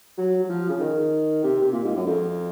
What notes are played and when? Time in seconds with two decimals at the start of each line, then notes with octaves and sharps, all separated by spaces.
0.18 F#3
0.44 F#3
0.49 F3
0.69 C#3
0.80 D#3
1.44 C3
1.62 C3
1.72 A#2
1.84 G#2
1.95 F#2
2.06 F2